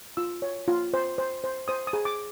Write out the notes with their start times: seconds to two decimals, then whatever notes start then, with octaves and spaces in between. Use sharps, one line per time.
0.17 F4 E6
0.42 C#5
0.68 F4
0.94 C5
1.18 C5
1.44 C5
1.68 C5 D#6
1.87 D#6
1.93 G#4
2.05 D6